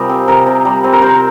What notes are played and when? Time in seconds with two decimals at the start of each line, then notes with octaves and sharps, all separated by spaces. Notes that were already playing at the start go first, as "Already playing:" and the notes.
Already playing: C3 G3 F4 G#4 A#4
0.09 C4
0.28 C3 A#4
0.46 C3
0.65 G3
0.84 C4
0.93 A#4
1.02 C3 C5